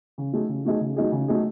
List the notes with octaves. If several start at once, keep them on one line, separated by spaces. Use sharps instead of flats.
C#3
F#3 A3 D#4 G#4
C#3
F#3 A3 D#4 G#4
C#3
F#3 A3 D#4 G#4
C#3
F#3 A3 D#4 G#4